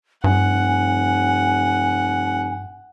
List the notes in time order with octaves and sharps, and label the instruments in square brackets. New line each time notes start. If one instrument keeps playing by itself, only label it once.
[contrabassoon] F1 [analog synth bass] G2 [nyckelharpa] F#5 [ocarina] G#5